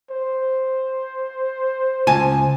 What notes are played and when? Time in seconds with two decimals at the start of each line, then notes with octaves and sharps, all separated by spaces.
0.11 C5
2.07 C#2 G#5 A5